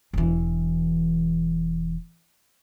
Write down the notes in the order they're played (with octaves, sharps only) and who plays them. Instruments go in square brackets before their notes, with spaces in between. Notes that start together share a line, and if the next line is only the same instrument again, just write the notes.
[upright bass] E1 E3